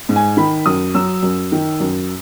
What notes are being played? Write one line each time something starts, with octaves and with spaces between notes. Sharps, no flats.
G#2
G#5
D#3 B5
F#2 D#6
F#3 E6
F#2
D#3
F#2